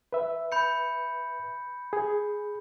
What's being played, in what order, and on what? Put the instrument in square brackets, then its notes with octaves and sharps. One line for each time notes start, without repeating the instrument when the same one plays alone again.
[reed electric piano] B4 E5
[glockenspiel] B5 G6 C#7
[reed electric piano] G#4